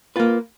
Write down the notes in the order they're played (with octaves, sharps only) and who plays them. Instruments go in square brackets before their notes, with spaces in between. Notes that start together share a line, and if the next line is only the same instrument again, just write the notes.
[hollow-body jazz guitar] A#3 F4 B4